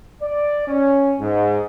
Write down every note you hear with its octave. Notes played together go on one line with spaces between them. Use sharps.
D5
C#4
G#2